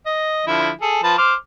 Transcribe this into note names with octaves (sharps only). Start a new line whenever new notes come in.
D#5
D3 F3 E4
G#4 A4
F3 B4 A5
C5 D6 F6